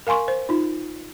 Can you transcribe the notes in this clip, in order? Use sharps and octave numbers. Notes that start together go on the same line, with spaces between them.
A#4 F5 G#5 C6 C#6
C5
D#4 F4